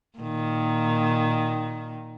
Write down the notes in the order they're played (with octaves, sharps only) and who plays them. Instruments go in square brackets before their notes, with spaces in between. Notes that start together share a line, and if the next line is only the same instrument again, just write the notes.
[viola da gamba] A#2 D#3